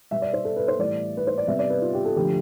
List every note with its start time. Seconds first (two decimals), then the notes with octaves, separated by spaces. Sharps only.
0.11 B2 G3 B3 E5
0.22 D5
0.33 C5
0.45 A4
0.56 B4
0.68 C5
0.79 A2 E3 G3 D5
1.17 B4
1.27 C5
1.38 D5
1.48 C3 G3 B3 E5
1.59 D5
1.70 B4
1.82 F4
1.94 G4
2.05 A4
2.16 D3 F3 A3 G4